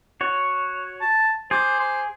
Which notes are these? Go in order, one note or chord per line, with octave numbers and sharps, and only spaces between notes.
F#4 C#5
A5
G#4 C5 D6
C5